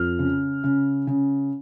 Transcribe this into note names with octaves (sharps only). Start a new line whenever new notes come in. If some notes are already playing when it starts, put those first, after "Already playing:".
Already playing: F2 F6
C#3
C#3
C#3